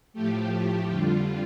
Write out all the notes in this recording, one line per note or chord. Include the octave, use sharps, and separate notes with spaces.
A2 F3 A3 G4
F2 D3 G3 F4